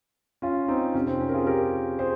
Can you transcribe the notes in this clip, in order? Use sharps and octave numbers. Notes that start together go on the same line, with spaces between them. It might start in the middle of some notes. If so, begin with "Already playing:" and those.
C#4 F4
C4 D#4
F2 C3 F3 C#4
C4
C#4
A#4
F4 G#4
G4 A#4
G#4 C5